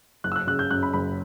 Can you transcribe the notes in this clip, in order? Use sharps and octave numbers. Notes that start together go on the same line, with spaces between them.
F#1 F#6
E6
F#6
C#3 F#6
G6
F#2 F#6
B5
F#1 B5